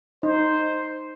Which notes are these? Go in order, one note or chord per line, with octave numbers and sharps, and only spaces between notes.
D#4 C5